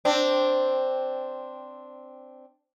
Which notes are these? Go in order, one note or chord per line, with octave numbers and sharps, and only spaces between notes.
C4 D4